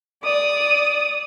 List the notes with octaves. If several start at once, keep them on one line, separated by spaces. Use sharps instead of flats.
D5 D#6